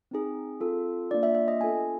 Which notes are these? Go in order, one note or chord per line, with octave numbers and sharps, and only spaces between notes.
C4 D#4 G#4
C4 F4 A4
A#3 D4 F4 D5
E5
E5
D#5
B3 D4 F4 A4 G#5